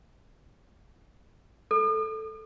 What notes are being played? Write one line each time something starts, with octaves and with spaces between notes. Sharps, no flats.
A4